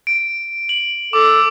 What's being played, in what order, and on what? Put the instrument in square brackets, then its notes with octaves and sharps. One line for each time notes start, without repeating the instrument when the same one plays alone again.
[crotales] D7
F#7
[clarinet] A4 [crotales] D6